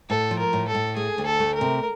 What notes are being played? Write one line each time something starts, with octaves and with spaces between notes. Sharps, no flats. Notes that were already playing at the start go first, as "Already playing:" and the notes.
A2 A4
F3
A#4
A2
A4
A2
A3 G#4
D2
A4
A3
A#4
C3